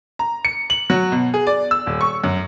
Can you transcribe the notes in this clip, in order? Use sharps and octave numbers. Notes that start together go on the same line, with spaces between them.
A#5
C#7
F#7
F#3
B2
G#4
D5
E6
D#1
C#6
F#2